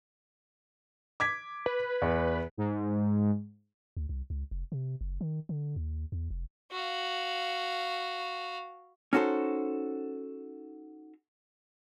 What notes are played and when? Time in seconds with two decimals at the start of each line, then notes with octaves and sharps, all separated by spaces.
1.20 D6 G#6 B6
1.66 B4
2.02 E2
2.57 G#2
3.97 D2
4.09 C2
4.30 C#2
4.51 F1
4.72 C3
5.01 F#1
5.21 D#3
5.49 D3
5.76 D#2
6.12 E2
6.31 F1
6.71 F#4 F5
9.13 C#4 D#4 F#4 A4 C5